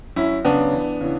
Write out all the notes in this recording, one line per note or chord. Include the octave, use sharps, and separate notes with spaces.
F#2 C#4 E4
C#3 F#3 B3 D4
E2
C#3 E3